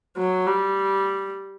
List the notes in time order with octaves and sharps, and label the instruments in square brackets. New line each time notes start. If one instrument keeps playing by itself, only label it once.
[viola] F#3
G3